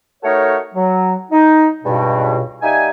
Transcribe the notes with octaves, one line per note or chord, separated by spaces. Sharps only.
A3 D#4 F#4 A4 A#4 C#5
F#3
D#4
C#2 G2 B2
G3 A#3 D#4 E5 G#5